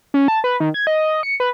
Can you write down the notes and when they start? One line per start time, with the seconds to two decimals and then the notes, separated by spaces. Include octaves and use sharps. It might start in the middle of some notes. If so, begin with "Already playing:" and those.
0.14 C#4
0.28 A5
0.44 B4
0.60 D#3
0.74 G#6
0.87 D#5
1.23 C#7
1.40 B4